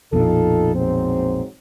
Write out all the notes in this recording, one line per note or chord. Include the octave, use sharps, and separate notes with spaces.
A#1 F2 B2 D#4 F4 A4
G#2 F#3 C4